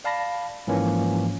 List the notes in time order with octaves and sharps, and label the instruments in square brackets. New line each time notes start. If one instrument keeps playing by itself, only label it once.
[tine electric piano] D5 F5 A5 B5 A#6
G#2 E3 F3 A#3 C#4